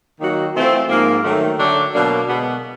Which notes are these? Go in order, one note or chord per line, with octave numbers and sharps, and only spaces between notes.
D#3 F#3 A#3 D#4 F#4
E3 A3 C4 F4
G#2 F3 A#3
D#3 F#3 A3
D3 F#3 A3 D4
B2 F#3 A#3 D4
B2 G#3 B3